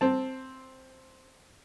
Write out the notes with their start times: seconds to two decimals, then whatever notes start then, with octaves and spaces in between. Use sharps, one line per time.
0.01 C4 A5